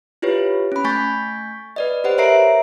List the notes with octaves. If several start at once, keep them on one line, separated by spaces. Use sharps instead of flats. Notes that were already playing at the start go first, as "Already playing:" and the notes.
E4 F4 G4 B4 C#5
C#4 B5
A3 G#5 C#6 G6 A6 B6
B4 D5 D#5
G4 B4 C5 F#5
A#4 C#5 E5 A#5 C7 D7